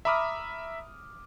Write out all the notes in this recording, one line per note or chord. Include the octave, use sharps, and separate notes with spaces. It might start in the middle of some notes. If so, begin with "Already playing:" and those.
E5 A#5 B5 D6 D#6 F6